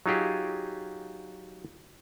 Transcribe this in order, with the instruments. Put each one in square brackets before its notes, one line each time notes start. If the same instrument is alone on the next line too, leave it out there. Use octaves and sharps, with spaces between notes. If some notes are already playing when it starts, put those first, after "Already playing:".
[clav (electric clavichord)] F#3 D#4 F4 G4 G#4